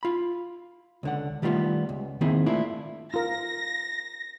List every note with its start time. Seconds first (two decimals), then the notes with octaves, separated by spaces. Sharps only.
0.03 F4 B5
1.03 C#2 D3 F#5
1.42 D#3 G3 A3 B3 F4
1.89 C#2
2.21 D#3 A#3 C4 E4 G#4
2.46 A3 A#3 D4 E4 F4
3.14 F4 A#4 A#6